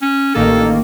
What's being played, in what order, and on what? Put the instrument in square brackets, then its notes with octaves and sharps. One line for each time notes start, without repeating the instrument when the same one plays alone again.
[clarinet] C#4
[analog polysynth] A1 D#3 A#3 [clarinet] A4